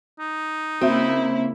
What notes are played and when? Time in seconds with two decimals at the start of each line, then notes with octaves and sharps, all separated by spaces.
0.19 D#4
0.81 C#3 A#3 C4 E4 F#4 E5